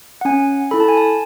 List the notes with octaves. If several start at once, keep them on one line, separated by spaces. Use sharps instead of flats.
F#5
C#4 G#5
E4 A4 B5
A5
G#5
A5